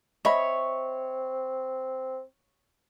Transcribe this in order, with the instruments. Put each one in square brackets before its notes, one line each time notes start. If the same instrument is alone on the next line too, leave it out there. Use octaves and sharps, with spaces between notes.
[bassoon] C4 [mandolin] C#5 [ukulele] D#5 E5 B5